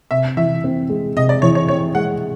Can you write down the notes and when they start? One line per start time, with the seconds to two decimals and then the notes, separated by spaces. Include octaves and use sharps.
0.11 C3 E5
0.37 E3 E5
0.64 C4
0.89 G#3
1.16 C3 D#5
1.29 D5
1.42 E3 C#5
1.55 C#5
1.68 C4 C#5
1.95 G#3 F#5